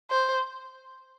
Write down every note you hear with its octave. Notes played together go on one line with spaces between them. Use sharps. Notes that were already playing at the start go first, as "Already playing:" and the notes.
C5